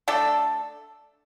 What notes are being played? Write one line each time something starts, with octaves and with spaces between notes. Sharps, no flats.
A3 D4 A4